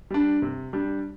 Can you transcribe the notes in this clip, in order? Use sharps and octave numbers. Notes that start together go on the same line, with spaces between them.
G3 D4
C3
G3 D4